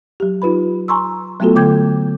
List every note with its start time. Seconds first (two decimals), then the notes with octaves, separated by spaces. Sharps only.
0.20 F#3 G4
0.42 D#4 F4 B4 B5
0.88 G#5 A#5 C6 C#6 E6
1.40 F#3 A3 B3 F4 F#4 A4
1.55 D3 G5 D6 G6 G#6